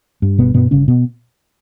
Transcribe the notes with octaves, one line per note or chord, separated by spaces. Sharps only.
G2
G1 B2 B3
G2 B2 B3
G1 C#3 C#4
B2 B3